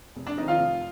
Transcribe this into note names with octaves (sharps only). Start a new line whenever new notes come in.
F1
D4 D5
F2 D#3 D#4 D#5
F4 F5
F1